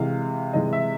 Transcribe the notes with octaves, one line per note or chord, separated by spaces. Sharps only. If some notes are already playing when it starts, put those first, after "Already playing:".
Already playing: C3 E3 G#3 F5
C3 E3 G#3 D#5
E5